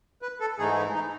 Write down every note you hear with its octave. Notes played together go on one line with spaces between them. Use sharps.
B4
A4
G#2 E3 A3 D#4 G#4
E4
D#4